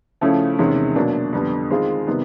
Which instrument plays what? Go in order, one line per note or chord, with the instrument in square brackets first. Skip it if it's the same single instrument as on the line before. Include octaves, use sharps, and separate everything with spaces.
[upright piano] C#3 F3 A3 C#4 E4
E2 C3 D#3 G#3 C#4
B2 F#3 A#3 D4
F2 D3 G3 B3
D#3 G#3 C4 F4 G#4
C3 D#3 G3 B3